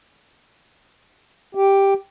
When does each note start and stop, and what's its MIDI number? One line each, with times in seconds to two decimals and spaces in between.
1.55 1.94 67